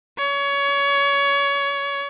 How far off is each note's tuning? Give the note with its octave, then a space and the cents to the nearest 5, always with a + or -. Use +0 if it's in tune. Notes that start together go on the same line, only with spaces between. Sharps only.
C#5 +25